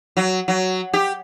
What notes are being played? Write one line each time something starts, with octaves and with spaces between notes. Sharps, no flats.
F#3
F#3
G4